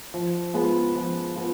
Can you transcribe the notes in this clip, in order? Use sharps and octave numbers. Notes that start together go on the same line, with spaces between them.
F3
G#3 B3 F4
F3
B3 F4